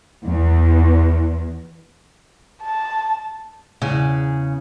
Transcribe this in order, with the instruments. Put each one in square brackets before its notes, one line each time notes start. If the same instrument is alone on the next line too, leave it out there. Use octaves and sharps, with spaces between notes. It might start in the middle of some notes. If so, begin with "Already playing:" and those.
[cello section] E2
[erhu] A5
[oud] E2 C#3